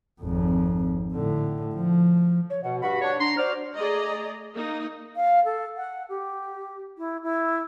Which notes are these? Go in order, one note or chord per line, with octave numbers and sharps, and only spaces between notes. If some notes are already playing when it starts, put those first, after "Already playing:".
G#1 F2
A2 D3
F3
C#5
B2 F#5
G2 F#4 F#5 B5
D4 C#5
D4 A#5 C6
F#4 C5 D5 F6
A3 G#4 D5 D#5 A#5
A#3 D#4
F5
A4
F#5
G4
E4
E4